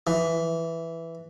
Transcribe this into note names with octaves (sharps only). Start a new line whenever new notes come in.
E3